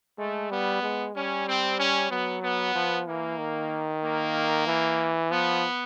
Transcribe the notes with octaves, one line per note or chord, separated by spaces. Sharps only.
G#3 A3
G3 B3
G#3
G3 C#4
C4
C#4
F#3 B3
B3
F3
E3 A#3
D#3
A#3
E3
F3 B3